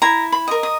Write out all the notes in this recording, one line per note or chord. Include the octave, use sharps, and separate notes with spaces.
E4 A#5
B5
A#4 D#5
D#6